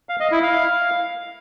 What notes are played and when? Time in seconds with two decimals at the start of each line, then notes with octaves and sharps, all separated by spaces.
0.09 F5
0.20 D#5
0.31 E4
0.43 F5